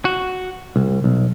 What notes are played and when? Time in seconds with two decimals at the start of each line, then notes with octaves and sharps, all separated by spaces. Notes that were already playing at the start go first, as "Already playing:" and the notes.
0.05 F#4
0.76 C2
1.04 B1